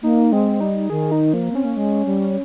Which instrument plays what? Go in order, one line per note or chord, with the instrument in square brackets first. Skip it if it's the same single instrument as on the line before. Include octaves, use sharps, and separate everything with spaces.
[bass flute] A#3 [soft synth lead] D#4
[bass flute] G#3 [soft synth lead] C4
[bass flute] G3 [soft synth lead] D#4
[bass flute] D#3 [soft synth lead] G#4
[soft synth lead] D#4
[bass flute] F3 [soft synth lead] A#3
[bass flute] C4 [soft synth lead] C#4
[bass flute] A#3
G#3
G3